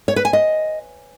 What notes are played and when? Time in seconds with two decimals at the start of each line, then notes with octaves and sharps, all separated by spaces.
0.08 C#5
0.16 B4
0.25 G#5
0.33 D#5